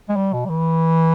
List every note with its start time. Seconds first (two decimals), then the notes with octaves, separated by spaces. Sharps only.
0.09 G#3
0.16 G3
0.33 B2
0.45 G3
0.49 E3